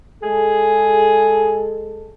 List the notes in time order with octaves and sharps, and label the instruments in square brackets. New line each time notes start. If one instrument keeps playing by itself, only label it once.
[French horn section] G#3 A4 [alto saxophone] G#4